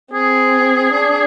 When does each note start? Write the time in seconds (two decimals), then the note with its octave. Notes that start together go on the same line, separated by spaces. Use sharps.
0.13 C4 G#4
0.95 D4